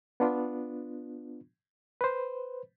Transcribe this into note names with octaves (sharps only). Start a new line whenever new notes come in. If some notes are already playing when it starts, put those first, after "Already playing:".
B3 D4 F4
B4 C5